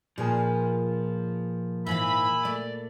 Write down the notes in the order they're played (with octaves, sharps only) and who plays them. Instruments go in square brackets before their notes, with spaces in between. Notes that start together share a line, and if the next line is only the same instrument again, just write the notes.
[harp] A#2 G#4 [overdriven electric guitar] F3 [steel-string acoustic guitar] B4
[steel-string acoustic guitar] G#2 E3 F5 [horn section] E5 G#5 B5
[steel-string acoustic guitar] A3 [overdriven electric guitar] D5